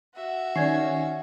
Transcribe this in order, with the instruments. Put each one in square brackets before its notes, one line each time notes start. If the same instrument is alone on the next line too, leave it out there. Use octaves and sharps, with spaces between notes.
[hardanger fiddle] F#4 E5
[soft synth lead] D#3 [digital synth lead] C#4 [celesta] D5 G#6 C7